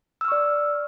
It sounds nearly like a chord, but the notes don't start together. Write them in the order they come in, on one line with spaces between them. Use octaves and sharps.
E6 F6 C#6 D5